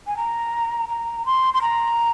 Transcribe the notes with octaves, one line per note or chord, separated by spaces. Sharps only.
G#5
A#5
A#5
C6
C6
A#5